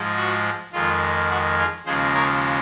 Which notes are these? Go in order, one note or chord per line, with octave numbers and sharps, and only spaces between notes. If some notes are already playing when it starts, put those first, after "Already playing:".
Already playing: G#2 F3 G#3
F#4
F2 D#3 G#3 F4
F#4
F4 G#4
D#2 C#3 F3 G#3 G#4 C5
A#4 C#5